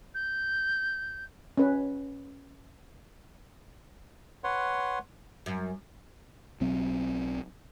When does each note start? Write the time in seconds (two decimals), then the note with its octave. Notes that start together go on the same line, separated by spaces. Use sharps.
0.15 G6
1.58 C#4 B4
4.44 B4 C#5 F#5 C6
5.46 F#2
6.61 B1 F#3 C4